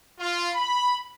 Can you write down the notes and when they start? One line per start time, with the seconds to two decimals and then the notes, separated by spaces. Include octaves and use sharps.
0.19 F4
0.54 B5